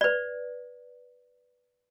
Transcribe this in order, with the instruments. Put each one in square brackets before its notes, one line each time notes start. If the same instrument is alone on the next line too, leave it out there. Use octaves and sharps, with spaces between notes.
[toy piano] B4 D5